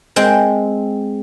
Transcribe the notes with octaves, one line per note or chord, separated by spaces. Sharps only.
G#3 C4 G5